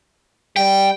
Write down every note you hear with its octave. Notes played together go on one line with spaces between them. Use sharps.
G3 G5